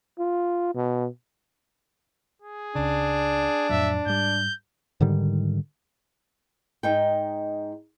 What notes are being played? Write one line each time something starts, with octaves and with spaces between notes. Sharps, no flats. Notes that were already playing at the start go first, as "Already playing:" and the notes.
F4
B2
G#4
C#2 C#3 D4
F2 A2 F#3 E5
G#2 G3 G6
G#2 D3 D#3 G3
G#2 D#4 G5